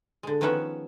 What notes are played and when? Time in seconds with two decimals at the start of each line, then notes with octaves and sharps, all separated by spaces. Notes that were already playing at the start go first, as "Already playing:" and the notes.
0.23 D3 G#3
0.41 D#3 F3 B3 C#4 E5 F#5